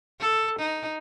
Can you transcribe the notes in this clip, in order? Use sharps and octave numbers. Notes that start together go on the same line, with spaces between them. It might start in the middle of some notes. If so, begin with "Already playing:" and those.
A4
D#4